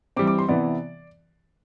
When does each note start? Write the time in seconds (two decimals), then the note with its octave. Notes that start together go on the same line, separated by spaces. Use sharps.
0.16 E3 G3 C4 D6
0.27 D6
0.39 C6
0.48 C3 E3 B3 D5